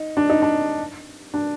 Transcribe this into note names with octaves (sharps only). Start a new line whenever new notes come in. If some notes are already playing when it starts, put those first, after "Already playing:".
Already playing: D#4
D4
D#4
D4
D4